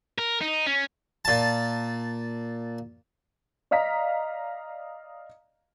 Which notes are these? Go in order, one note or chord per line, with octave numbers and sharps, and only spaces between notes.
A#4
D#4
C#4
A#2 A5
D5 D#5 F5 A#5 B6